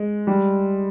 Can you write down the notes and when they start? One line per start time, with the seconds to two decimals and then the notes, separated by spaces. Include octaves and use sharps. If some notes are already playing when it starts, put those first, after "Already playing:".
Already playing: G#3
0.27 G3